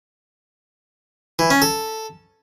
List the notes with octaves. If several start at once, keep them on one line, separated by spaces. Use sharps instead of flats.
E3
C#4
A4